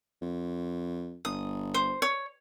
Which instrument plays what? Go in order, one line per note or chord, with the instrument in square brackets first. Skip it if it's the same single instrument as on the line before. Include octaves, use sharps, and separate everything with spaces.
[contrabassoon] F2
[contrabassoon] G1 [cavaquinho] D#6
[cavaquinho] C5
C#5